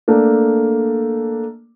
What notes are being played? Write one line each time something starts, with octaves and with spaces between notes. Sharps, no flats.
A3 A#3 D4